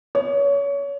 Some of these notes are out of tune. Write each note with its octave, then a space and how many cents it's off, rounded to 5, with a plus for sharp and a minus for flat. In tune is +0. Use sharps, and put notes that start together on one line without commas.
C#5 +25